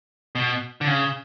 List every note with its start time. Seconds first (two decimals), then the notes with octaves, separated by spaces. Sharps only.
0.35 B2
0.81 D3
0.87 C#3